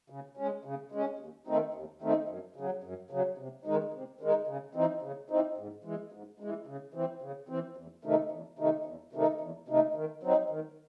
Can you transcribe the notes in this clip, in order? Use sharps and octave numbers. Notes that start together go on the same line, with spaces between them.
C#3
G#3 C#4
C#3
G#3 C#4
D#2
D#3 A3 C4 D#4
D#2
D#3 A3 C4 D#4
F#2
C#3 F#3
F#2
C#3 F#3
C3
D#3 G#3 D#4
C3
D#3 G#3 D#4
C#3
E3 C4 D#4
C#3
E3 C4 D#4
G#2
E3 G#3
G#2
E3 G#3
C#3
E3 C4
C#3
E3 C4
E2
C3 D#3 A3 D#4
E2
C3 D#3 A3 D#4
E2
C3 D#3 A3 D#4
E2
C3 D#3 A3 D#4
D#3
F#3 C4 D#4
D#3